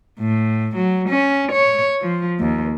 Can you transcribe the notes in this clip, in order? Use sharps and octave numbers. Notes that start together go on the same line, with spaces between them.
A2
F#3
C#4
C#5
F3
D#2